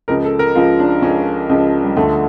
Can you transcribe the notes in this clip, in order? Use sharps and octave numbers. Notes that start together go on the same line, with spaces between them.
C#2 C#3 F3 A#4
A4
A#4
C#2 C#3 F3 F4
D4
C#2 C#3 F3 C#4
C#2 C#3 F3
G3
D2 D3 F3 A3